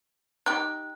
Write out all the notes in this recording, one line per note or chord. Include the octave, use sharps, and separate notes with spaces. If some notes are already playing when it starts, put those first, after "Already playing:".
D#4 G4 F#6